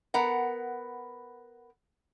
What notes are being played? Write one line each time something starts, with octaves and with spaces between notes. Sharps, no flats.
B3 A#4 F#5